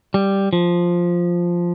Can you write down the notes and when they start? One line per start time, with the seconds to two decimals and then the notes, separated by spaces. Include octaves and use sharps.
0.14 G3
0.53 F3